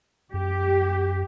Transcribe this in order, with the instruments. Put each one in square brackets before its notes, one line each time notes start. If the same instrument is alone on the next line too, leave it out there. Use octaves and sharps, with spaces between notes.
[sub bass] F#2 [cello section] G4